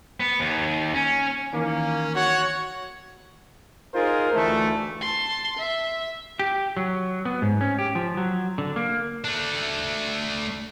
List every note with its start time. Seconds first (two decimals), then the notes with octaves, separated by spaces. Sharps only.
0.20 B3
0.40 D#2
0.94 C#4
1.53 D#3 E3 A#3 C#4
2.16 F#4 C#5 F#5
3.95 D#4 F4 G#4 A#4 C5
4.34 D2 E3 A3
5.01 A5 C6
5.57 E5
6.39 G4
6.77 F#3
7.25 B3
7.42 G#2
7.61 C#4
7.79 G4
7.95 F3
8.17 F#3
8.58 D3
8.76 A#3
9.24 A3 D4